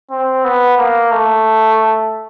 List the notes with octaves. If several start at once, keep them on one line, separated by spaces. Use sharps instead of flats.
C4
B3
A#3
A3